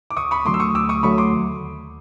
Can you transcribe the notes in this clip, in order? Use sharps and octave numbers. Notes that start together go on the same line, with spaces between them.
D6
D2 C#6 D#6
B5 C#6
D3 F#3 A3 C6 D6
E6
C#6 D#6
D2 D6 E6
C#6 D#6
D3 F#3 A3 B5 C#6
C6 D6
D#2